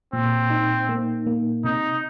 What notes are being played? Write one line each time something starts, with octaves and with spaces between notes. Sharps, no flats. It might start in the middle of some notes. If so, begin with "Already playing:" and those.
A#2 C4
D#4
A#3
A#3
C3 D#4